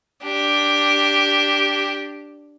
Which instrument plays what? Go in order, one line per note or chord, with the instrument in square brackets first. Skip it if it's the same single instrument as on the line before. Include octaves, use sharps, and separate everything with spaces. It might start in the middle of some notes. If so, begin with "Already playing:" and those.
[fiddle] D4 G4